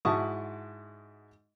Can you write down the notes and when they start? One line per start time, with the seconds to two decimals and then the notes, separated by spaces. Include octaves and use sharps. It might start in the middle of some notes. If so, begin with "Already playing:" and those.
0.05 G#2 E4 F#4 A5 C#6 D#6